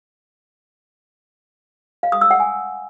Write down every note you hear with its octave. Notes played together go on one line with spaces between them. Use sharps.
F5
D#6
E6
F#5
G#5